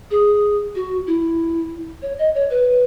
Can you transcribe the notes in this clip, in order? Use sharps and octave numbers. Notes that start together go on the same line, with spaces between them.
G#4
F#4
E4
C#5
D#5
C#5
B4